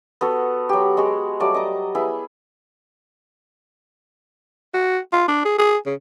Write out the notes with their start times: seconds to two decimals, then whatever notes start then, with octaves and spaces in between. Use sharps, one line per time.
0.21 B3 F#4 A4
0.69 F#3 G4
0.97 G#3 F#4 G#4
1.40 F#3 G3 A3 D5
1.54 D#5 A#5 D6
1.95 B3 E4 G#4
4.74 F#4
5.13 F4
5.28 D4
5.45 G#4
5.58 G#4
5.86 C#3